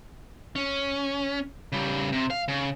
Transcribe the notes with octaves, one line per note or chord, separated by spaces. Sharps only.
C#4
C#3 G3
C3
F5
C#3